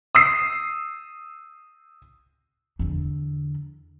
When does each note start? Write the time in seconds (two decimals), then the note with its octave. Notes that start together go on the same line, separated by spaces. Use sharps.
0.15 D#6 E6 C7
2.79 E2 D3